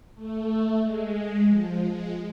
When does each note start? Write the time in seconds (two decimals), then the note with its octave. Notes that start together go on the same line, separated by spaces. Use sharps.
0.15 A3
0.81 G#3
1.48 F3
1.81 G#3